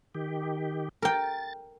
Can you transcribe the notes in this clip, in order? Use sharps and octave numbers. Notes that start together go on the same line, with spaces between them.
D#3 G4
A#4 G5 A6